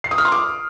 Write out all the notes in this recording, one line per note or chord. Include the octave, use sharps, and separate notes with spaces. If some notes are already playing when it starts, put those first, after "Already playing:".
C7
D#6
F6
C6
D6